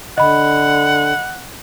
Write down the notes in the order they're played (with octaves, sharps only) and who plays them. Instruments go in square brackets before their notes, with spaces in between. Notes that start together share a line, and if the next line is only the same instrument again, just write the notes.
[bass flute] D3 [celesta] D#5 B5 [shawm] F#5